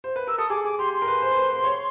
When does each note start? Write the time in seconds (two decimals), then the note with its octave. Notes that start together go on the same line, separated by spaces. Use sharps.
0.04 C5
0.16 B4
0.27 A#4 E6
0.38 A4 D#6
0.50 G#4 D6
0.65 G#4 D6
0.79 G4 C6
0.93 C6
1.02 A#4
1.07 B4
1.22 C5
1.32 B4
1.36 C5
1.50 C5
1.64 C#5